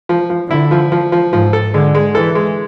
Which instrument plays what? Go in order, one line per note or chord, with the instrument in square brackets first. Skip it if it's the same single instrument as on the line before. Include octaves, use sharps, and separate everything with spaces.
[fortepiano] F3
F3
[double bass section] D3 [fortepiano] E4
[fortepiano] F3
F3
F3
[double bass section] G#2 [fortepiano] F3
[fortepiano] A4
[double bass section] D3 [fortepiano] G#3
[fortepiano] G#3
[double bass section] E3 [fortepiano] A4
[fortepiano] G#3